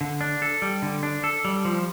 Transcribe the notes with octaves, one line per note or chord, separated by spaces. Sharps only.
D3
D4
A4
G3
D3
D4
A4
G3
F3